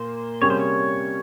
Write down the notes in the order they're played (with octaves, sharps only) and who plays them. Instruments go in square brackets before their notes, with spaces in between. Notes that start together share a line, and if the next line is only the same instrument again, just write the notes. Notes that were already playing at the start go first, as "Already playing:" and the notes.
Already playing: [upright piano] A#2 A#3 [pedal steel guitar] C5
[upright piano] C3 G3 A#3 C#4 G#4 [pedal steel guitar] C#5
[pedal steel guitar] C5
C#5